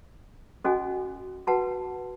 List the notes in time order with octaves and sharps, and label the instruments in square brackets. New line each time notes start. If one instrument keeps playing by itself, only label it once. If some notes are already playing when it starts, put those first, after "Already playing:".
[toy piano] C#4 F#4 A4 D#5 G#5
F#4 B4 F#5 A5